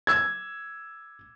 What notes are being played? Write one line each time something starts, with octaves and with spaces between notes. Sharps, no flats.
E6 G#6